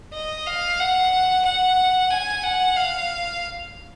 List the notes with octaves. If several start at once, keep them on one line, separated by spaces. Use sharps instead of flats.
D#5
F5
F#5
F#5
G#5
F#5
F5